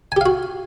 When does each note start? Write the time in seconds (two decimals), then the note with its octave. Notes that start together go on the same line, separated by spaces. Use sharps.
0.12 G#5
0.16 G4
0.21 F5
0.26 F#4